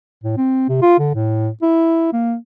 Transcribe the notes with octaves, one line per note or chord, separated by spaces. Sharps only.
A2
C4
C3
F4
D3
A2
E4
A#3